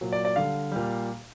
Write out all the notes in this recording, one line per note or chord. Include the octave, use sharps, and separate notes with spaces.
A#2 F#3
D5
D5
D3 G3 F5
A#2 G3